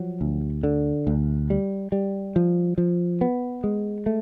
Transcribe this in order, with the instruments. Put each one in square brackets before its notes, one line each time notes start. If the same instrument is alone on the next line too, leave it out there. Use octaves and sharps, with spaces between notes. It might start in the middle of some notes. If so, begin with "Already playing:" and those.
Already playing: [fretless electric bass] F3 F#3
D2
D3
D2
G3
G3
F3
F3
B3
G#3
A3